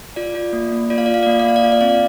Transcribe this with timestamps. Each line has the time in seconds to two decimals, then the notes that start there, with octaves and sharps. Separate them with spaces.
0.16 F4 D5
0.35 F4
0.53 A#3
0.72 A#3
0.90 F4 D5
0.98 F5
1.06 F4 D5
1.14 F5
1.23 D5
1.26 A#3 F5
1.40 D5
1.45 A#3 F5
1.56 D5
1.63 F4 F5
1.72 D5
1.81 C4 F5
1.89 D5